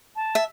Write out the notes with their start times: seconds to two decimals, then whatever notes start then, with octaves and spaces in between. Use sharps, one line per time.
0.16 A5
0.35 E5